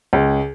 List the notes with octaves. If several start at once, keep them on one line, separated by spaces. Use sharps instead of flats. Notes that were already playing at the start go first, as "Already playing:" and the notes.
C#2